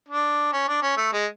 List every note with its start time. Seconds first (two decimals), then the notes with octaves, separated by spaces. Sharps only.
0.09 D4
0.53 C#4
0.68 D4
0.82 C#4
0.97 A3
1.13 G#3